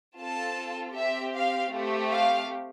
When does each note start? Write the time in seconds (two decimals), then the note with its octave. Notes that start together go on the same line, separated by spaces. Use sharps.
0.19 C4 F4 A4 A5
0.97 C4 G4 E5
1.35 F5
1.73 A3 C4 G4
2.13 F5